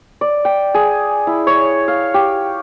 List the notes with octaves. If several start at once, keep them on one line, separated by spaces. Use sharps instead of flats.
D5
G5
G#4
E4
C#5
F5
G4